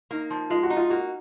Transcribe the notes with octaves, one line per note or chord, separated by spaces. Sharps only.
A#3 D#4
F3
G#3 F4
F#4
D#4
F4
A#3 F#4